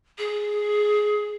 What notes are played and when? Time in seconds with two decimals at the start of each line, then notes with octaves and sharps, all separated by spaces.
0.18 G#4